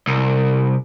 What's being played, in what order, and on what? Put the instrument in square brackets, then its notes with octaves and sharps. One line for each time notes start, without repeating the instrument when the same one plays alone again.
[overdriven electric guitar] C2